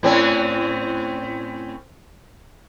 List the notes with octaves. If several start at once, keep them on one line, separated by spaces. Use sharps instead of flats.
A2 C4 C#4